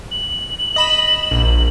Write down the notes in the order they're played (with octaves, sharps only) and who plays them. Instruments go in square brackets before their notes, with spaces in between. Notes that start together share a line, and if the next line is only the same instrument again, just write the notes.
[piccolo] F#7
[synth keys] D#5 B5 E7
A#1